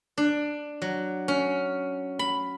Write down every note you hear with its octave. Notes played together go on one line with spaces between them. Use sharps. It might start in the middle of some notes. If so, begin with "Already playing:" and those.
D4
F#3
C#4
B5